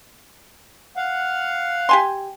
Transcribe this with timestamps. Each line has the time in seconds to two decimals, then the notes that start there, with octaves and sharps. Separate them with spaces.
0.97 F5 F#5
1.89 G4 G#5 C6